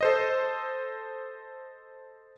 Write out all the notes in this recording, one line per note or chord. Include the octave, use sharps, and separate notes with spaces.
A4 C5 D#5